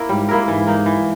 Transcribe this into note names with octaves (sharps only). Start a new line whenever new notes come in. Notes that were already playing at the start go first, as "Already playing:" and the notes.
Already playing: A#3 E4 A#4
G#2 G3
A#3 E4 A#4
G#2 E3
A#3 D#4
E3